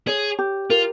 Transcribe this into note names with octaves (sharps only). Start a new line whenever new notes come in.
G#4 C#5
G4
F4 A#4